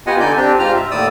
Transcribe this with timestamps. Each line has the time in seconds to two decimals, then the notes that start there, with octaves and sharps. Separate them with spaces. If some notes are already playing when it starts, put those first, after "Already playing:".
0.07 B3 F4 G4 D#5 F#5 G#5
0.20 D3 D#4 D5 G#5 G6
0.36 C4 D4 G4
0.59 G#2 F4 G4 A#5 F6
0.76 E5
0.91 D#2 A2 D5 D#6 E6